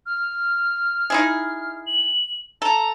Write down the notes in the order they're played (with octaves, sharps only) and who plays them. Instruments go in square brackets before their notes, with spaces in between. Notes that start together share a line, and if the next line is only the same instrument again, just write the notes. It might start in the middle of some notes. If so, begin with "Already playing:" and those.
[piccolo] F6
[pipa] D#4 E4 G#4
[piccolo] F#7
[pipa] A4 [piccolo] A#5